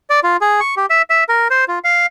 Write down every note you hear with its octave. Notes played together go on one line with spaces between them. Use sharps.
D5
F4
G#4
C#6
G4
E5
E5
A#4
C5
F4
F5